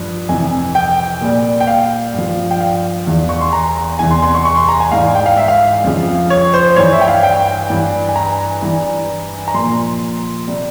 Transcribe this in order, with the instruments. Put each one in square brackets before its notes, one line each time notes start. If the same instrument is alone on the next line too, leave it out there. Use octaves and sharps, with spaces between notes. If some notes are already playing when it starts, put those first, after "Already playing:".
Already playing: [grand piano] G2 F3
F2 C3 E3 G#5
G5
A#2 G3
G5
F5
G2
F3
G5
F5
E2 E3 G3
C#6
C6
A#5
E2 C3 E3 G3 G#5
C6
C6
C#6
C#6
C6
A#5
G#5
G#2 E3 G3 F5
G5
F5
E5
F5
F2 C#3 F3
C#5
C5
G2 E3 G3 C#5
E5
G5
F5
G5
G2 E3 G3
G#5
A#5
G2 E3 G3
A#5
A#2 F3 C6
C3 G3